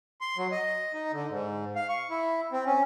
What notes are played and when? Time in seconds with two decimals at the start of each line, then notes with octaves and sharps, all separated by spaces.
0.21 C6
0.37 F#3
0.52 D#5
0.94 D#4
1.12 D3
1.30 G#2
1.76 F5
1.89 C#6
2.10 E4
2.52 C4
2.66 C#4